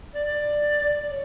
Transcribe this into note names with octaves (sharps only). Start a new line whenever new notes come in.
D5
C#5